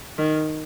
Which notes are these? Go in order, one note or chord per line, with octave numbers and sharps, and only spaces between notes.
D#3